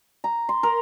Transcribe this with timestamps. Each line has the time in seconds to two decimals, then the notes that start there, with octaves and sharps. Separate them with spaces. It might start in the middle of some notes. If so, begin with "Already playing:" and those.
0.24 A#5
0.49 C6
0.63 A#4